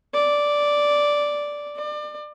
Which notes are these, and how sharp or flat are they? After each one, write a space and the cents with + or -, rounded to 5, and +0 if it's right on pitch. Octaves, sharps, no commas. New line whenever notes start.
D5 -5
D5 +30